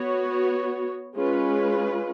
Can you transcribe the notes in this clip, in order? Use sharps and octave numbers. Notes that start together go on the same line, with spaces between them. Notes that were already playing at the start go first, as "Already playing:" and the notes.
Already playing: B3 F#4 C#5
G#3 C#4 F4 B4